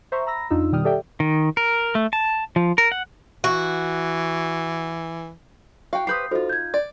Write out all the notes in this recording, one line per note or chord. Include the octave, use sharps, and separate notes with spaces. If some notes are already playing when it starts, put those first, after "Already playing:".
C5 E5 A#5 C#6
A#5 B5 E6 A#6
F2 D4 D#4 F4 E6
B2 D#3 G3 G5 D#6 F6
G4 A4 D5 E5 G5
D#3
A#4
A3
A5
F3
A#4
F#5
E3 F#4
F#4 F5 G5
G4 B4 C5 D#6 G6 C7
D#4 F4 F#4 A4 C5
G6 G#6
D5